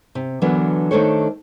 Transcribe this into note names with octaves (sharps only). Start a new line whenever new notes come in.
C3
D3 E3 F#3 B3 D4 A#4
D#3 A3 D4 A4 C5 C#5